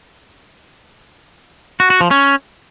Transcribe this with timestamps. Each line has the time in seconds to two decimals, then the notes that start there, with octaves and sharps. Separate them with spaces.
1.80 F#4
1.90 F#4
2.01 F3
2.11 C#4